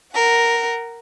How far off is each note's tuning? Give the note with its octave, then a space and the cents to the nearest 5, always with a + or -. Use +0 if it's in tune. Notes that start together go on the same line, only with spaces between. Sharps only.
A#4 +0 F#5 +20